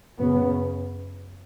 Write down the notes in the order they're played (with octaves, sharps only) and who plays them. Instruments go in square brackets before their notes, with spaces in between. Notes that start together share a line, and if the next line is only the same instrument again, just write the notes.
[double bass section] F#2 C#3 B3